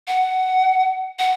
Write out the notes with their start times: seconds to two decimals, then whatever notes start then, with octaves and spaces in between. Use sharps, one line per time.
0.08 F#5
1.19 F#5